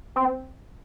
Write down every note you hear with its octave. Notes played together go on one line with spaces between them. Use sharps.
C4